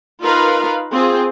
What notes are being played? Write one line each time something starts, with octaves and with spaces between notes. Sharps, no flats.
D#4 F4 A#4 B4 F5
C4 F4 G#4